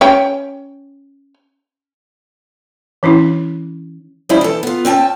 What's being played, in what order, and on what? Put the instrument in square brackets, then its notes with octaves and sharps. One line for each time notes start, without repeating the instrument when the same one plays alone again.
[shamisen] C#4 G5
[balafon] E3 C#4 D4 E4
[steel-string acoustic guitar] F3 G3 G#3 C4 C#4 E4
E3 A4
B3 F4
C4 C#4 G5 A5